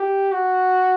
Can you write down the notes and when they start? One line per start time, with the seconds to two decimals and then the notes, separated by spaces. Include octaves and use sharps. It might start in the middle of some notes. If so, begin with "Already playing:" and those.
Already playing: G4
0.32 F#4